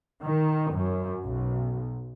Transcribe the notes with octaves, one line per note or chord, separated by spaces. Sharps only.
D#3
F#2
B1